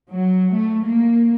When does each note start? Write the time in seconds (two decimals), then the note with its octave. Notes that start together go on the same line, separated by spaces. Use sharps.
0.11 F#3
0.54 A3
0.87 A#3